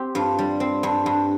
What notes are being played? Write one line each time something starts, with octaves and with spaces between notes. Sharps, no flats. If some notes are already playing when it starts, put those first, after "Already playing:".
Already playing: C4 G4
G2 F4
G3
C4
G2
G2